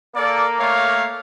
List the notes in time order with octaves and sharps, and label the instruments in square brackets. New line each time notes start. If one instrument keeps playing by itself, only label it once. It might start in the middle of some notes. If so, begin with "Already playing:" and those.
[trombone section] A#3 [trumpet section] A4 D5
[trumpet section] A3 C#5 F5